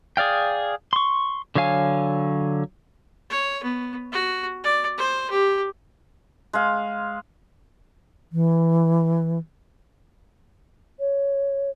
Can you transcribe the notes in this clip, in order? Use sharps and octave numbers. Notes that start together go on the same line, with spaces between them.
G#4 D5 F5 G5
C6 C#6
D3 F#3 C#5 F5 G#5
C#5
B3
F#4
D5
C5
G4
G#3 F5
E3
C#5